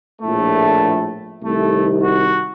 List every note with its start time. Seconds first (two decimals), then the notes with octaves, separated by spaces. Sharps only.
0.21 A#1 A2 A3
1.43 C2 C3 D#3 A3
2.04 F#4